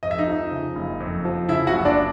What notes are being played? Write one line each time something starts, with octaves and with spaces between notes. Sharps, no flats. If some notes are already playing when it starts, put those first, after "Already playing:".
F2 D#5
E5
D#4 D#5
F3
C#3
F#1
F2
F3
C#3 E4 E5
F#4 F#5
F#1
D4 D5